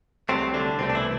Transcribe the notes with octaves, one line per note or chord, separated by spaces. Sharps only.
C2 C3 F#3 A3 C4
D3 D4
C2 B2 A3 C4
D4
E3 E4